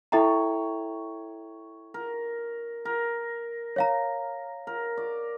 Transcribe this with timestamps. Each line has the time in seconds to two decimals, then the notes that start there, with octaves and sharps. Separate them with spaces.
0.12 E4 A4 C#5 E5 G5 A#5
1.94 A#4
2.85 A#4
3.76 C#5 F5 A#5
4.67 A#4
4.97 D5